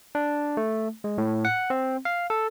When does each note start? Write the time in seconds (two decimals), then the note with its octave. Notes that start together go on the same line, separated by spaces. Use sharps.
0.15 D4
0.57 A3
1.04 G#3
1.18 A2
1.45 F#5
1.70 C4
2.05 F5
2.30 A4